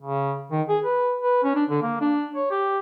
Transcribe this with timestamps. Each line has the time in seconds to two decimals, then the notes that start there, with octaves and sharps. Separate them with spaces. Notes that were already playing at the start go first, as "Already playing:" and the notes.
0.02 C#3
0.52 D#3
0.69 G#4
0.84 B4
1.22 B4
1.44 C#4
1.55 D4
1.70 D3
1.83 A#3
2.01 D4
2.34 C#5
2.51 G4